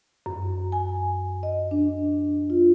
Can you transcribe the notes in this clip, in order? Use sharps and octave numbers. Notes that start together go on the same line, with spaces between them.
F#2
G#5
D#5
D4
F4